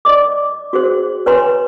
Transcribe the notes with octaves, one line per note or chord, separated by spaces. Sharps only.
D5 D#5 D6
F#4 G#4 C5
B4 C#5 G#5 A#5 C6